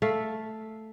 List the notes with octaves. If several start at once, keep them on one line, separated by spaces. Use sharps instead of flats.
A3 A4 E5 F5